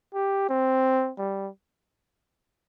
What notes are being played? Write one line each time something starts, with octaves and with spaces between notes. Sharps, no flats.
G4
C4
G3